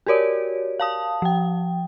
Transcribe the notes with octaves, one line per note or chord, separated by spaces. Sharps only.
F#4 G4 A#4 C#5 D5
F5 A5 D#6
F3 G5